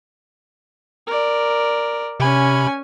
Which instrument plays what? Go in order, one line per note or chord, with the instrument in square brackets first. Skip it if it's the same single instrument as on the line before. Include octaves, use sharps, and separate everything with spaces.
[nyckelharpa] A#4 D5
[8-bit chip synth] C3 B5 [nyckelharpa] C#4 G#5